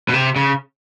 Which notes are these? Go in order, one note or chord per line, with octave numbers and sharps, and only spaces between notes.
B2
C3
C#3